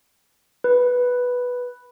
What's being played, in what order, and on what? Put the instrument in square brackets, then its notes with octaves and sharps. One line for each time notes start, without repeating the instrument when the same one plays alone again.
[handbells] B4